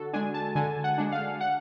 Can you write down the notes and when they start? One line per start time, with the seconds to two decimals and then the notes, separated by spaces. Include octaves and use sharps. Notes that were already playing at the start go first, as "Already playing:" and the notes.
Already playing: D3 F#4 A4
0.13 G#3 D4 G#5
0.34 A5
0.55 D3 G#5
0.84 F#5
0.98 G#3 D4
1.12 F5
1.41 F#5